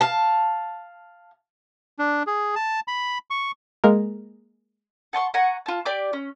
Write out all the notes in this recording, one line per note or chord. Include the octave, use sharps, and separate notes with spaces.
F5 A5
D4
G#4
A5
B5
C#6
G#3 A#3 A#4
F#5 A5 C6 C#6
F#5 G#5 A#5 C#6
F4 A5
G4 D5 D6
C#4